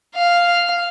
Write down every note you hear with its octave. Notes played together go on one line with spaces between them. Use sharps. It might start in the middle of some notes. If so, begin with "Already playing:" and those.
F5